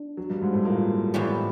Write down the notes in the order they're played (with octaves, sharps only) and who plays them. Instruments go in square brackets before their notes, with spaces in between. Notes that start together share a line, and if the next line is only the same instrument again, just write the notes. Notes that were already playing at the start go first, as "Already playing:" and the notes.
Already playing: [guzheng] D4
[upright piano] F#3
G2 G3
G#2 G#3
A2 A3
A#2 A#3
[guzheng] A2 E3 G3 B3